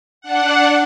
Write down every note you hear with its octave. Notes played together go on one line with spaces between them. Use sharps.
D4 F#5